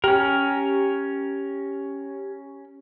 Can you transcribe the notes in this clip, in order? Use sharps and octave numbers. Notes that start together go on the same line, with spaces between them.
C#4 G4 A#4